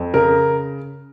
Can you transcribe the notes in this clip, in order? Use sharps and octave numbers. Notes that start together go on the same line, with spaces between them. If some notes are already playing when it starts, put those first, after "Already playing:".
Already playing: F2
C#3 A#4